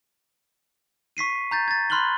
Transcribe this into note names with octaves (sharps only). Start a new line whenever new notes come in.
C#6 B6 C7 D#7
A#5 G6 A6
G#6 A6
B5 C6 F6 F#6 F#7 G7